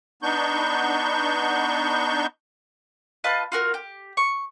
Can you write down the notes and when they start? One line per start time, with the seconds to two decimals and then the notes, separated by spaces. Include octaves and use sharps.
0.23 B3 D4 D#4 C#6 G6
3.24 F4 B4 D#5 A5
3.52 F4 F#4 A#4
3.74 G4
4.17 C#6